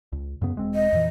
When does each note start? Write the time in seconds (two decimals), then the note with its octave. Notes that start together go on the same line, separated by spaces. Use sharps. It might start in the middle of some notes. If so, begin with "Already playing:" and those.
0.12 C#2
0.42 F#2 C#3 B3
0.55 E1 G#3 C4
0.75 D#5
0.92 F2 A#2 E3